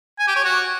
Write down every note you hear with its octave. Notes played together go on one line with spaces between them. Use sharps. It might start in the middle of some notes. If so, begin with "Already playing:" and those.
G#5
G4
C#5
F#4